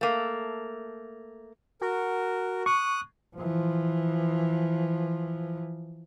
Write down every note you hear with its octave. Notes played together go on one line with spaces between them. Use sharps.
A3 A#3
F#4 A#4
C#6 D#6 F#6
E3 F3